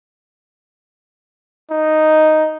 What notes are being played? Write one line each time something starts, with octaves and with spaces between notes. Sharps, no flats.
D#4